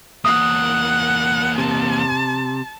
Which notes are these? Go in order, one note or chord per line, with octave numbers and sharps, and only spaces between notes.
E2 A#3 F#5 D#6
C3 A5